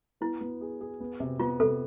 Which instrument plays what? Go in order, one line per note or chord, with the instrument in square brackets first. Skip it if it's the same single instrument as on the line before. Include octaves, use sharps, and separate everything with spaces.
[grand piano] B3 [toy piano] E4
[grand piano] B3
G#4
G#4
B3
C3
[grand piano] B3 [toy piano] F4
[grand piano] C3 [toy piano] A4